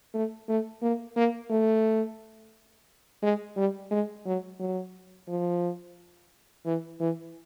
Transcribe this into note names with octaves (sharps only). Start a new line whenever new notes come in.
A3
A3
A#3
A#3
A3
G#3
G3
G#3
F#3
F#3
F3
E3
E3